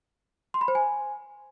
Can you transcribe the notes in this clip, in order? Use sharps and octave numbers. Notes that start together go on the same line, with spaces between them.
C6
B5
C5
G#5